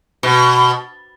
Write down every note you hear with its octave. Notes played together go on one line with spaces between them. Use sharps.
B2